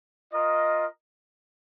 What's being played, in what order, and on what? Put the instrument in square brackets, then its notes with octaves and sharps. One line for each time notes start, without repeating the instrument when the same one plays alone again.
[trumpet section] F4 A#4 D#5